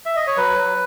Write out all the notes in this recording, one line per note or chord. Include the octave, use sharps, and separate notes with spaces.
E5
D#5
C#5
F#3 B4
F#3